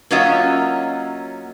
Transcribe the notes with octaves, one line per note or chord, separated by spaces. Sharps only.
F#3 A#3 C#4 F4 D#5 E5